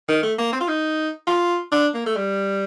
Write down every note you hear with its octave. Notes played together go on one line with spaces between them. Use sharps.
D#3
A3
A#3
C4
F4
D#4
F4
D4
A#3
A3
G3